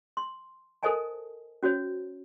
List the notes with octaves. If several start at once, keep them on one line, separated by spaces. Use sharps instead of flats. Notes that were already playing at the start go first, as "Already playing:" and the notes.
C6
A4 A#4 C5 D#5 G#5 A5
C#4 F#4 C5 C#5